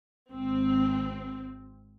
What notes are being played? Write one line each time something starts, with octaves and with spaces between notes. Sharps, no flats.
G#1 C4